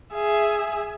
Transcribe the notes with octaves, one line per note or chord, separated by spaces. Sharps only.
G#4 E5